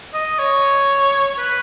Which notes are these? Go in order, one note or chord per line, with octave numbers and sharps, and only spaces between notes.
D#5
C#5
B4